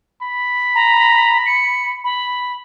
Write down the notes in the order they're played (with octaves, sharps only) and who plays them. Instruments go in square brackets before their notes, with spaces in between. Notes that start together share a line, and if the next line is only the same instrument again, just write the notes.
[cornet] B5
[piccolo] A#5
C#7
B5